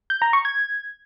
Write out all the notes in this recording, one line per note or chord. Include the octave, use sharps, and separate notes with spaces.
G6
A#5
C#6
G#6